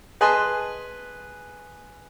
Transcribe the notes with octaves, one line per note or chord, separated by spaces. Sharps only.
G#4 B4 D#5 G#5 A5 C6